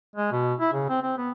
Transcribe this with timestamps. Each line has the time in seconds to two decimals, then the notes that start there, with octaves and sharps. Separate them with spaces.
0.16 G#3
0.32 B2
0.60 E4
0.73 C#3
0.89 C4
1.02 C4
1.18 B3